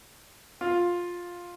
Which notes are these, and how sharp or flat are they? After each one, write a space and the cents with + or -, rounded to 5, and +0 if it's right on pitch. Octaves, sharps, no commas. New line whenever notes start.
F4 +10